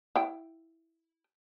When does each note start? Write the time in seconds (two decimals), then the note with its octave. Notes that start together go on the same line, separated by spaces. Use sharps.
0.16 E4 G5